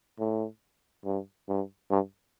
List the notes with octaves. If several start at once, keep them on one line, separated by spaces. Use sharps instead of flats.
A2
G2
G2
G2